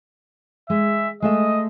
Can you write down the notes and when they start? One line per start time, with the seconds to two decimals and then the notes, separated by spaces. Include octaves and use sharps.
0.70 G#3 E5
1.22 G#3 A3 D#5 E5